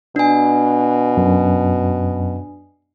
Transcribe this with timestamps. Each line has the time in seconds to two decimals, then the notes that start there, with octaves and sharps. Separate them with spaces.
0.16 B2 D4 G#5
1.17 F#2